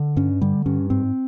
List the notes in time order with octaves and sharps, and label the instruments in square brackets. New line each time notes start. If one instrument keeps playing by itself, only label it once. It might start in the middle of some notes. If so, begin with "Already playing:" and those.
Already playing: [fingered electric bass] D3
G2 C#4
D3 G3
G2 C#4
G#2 C4